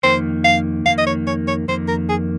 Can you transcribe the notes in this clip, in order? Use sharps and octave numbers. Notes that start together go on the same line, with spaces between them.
F2 D#3 A#3 C5
F5
F2 D#3 A#3 F5
D#5
C#5
C#5
C#5
F2 D#3 A#3 C5
A#4
G#4